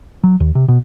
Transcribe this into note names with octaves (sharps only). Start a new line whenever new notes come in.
F#3
D#2
C3
B2